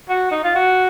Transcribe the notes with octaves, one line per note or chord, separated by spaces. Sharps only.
F#4
D#4
F4
F#4